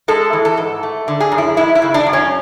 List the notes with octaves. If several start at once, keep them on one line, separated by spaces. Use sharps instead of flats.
G#3 A4
E3
A4
G#2
A3
D3
G#4
F#2
E4
G#3 E4
E4
C#3
D4
F#2
C#4